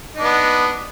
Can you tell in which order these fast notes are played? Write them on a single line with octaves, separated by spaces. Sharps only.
D#4 D4 B3